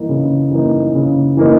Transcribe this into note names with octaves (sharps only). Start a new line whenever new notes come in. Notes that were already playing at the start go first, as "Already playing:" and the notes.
Already playing: E3 A#3 D#4
C#3
E3 A#3 D#4
C#3
E3 A#3 D#4